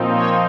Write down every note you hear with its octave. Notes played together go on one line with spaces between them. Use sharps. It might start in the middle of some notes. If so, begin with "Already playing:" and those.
Already playing: A#2 F3 C4 D#4
C#5